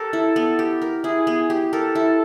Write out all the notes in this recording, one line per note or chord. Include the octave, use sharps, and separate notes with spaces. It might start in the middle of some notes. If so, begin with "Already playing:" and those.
Already playing: G4 A4 A#4
E4
B3
G4
A#4
E4 G#4
B3
G4
A4 A#4
E4